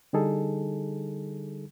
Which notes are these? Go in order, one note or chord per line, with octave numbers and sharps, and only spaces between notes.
D3 G3 D#4 G#4 A4